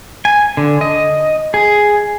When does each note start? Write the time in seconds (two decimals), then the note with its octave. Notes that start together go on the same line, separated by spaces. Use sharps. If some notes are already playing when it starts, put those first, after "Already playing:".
0.25 G#5
0.57 D3
0.81 D#5
1.54 G#4